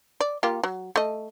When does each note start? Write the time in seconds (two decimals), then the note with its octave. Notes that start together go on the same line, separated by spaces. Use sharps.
0.20 D5
0.43 A#3 F4 G4
0.64 F#3
0.96 A3 D#5